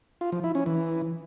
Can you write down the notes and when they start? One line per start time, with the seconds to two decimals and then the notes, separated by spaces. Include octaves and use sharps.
0.21 F4
0.32 F3
0.44 E4
0.55 C#4
0.66 E3